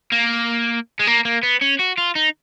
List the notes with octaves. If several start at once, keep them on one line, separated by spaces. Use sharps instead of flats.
A#3
G#3
A#3
A#3
B3
C#4
F#4
F4
D#4